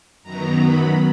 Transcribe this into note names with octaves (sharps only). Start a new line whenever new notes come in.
F#2 D#3 F#3 B3 A#5
B5